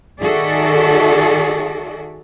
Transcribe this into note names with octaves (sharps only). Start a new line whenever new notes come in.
D#3 F#4 G#4 A4 D5 E5